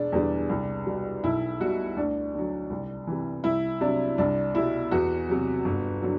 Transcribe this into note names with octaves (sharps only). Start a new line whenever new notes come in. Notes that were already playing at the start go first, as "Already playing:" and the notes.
Already playing: E1 D4
E2 D3 G3
C2
B2 G3
B1 E4
B2 G3 F#4
D2 D4
D3 F#3
C2
C3 E3
C2 E4
C3 F#3 D4
C2 D4
B2 G3 E4
E2 F#4
C3 F#3
G1
D3 F#3